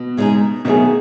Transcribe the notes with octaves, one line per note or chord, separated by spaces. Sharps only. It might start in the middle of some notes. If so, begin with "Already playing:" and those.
Already playing: B2
C#3 G#3 D#4 G#4
B2 D#3 F#3 A3 D#4 G#4